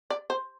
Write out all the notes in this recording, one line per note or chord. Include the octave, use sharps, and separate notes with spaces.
D5
C5